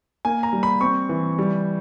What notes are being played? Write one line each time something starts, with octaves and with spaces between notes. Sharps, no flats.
A#3 G#5
A#5
G3
B5
C4 C#6
E3
G3